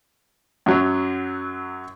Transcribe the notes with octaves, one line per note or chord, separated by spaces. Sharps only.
F#2 F#3